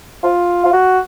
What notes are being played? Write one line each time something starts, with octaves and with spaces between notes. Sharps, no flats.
F4
F4
F#4